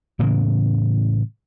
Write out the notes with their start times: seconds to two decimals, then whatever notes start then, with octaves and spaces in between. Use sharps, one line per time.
0.19 A2 C#3 E3 A#3